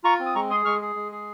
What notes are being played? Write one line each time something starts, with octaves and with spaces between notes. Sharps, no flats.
F4 A#5 C#6
C4
D#6
G#3 A#5 C#6
G#4 C6 D#6
G#3 C#6 F6
G#4
G#3
G#4